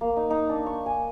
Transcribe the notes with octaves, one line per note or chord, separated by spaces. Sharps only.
A#3
D#4
D#4
D4
C#6
G#5